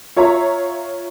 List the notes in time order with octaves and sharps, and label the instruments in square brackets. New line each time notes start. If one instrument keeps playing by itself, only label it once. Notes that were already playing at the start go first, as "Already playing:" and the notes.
[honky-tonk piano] F4 C#5 E5 A#5